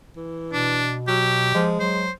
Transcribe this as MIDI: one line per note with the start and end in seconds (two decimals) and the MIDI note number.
0.17 0.87 52
0.53 1.53 47
0.53 0.96 62
1.08 1.54 54
1.08 1.67 67
1.54 1.76 53
1.54 2.04 56
1.80 2.09 54
1.80 2.12 72